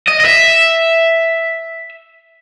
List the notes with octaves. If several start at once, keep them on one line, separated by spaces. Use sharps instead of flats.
D#5
D#5
E5